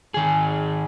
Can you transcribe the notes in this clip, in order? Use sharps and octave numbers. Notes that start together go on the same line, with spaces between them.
D#3 G#4